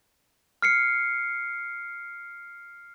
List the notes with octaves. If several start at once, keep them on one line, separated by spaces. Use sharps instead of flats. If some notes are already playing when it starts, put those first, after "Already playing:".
F6 C7 C#7